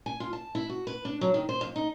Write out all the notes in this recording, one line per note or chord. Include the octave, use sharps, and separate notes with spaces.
G#5
F4
A5
E4
F#4
B4
D4
F#3
D#3
C5
F2
D#4